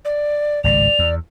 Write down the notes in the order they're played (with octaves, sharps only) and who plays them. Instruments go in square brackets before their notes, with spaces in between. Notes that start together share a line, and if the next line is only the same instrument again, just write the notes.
[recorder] D5
[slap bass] G#1 C#2 A2 [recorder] D5 [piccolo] F7
[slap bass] E2